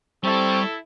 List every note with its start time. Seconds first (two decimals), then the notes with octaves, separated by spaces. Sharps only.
0.24 G3 C4 E4 A4 C#6